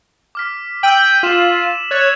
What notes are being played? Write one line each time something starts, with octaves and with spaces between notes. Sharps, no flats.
D6 F6 B6
G5 E6 D#7 F#7
F4 B6 E7
C#5 F#6 A6 E7